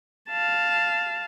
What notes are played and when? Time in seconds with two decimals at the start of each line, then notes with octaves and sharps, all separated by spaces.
0.30 F5 A5